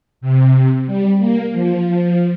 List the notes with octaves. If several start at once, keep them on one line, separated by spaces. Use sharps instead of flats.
C3
G3
A#3
F3